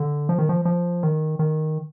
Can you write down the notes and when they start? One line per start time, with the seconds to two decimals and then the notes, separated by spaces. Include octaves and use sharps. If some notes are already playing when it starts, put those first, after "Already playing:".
Already playing: D3
0.29 F3
0.39 D#3
0.49 F3
0.65 F3
1.03 D#3
1.39 D#3